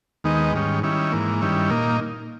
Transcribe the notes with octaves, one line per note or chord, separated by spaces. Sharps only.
D#2 D#3 G#3 B3 D#4
G#2 D#3 G3 C#4
D#3 G3 C#4 E4
G#2 E3 A#3
G2 D#3 G3 C#4 E4
A#2 A#3 D#4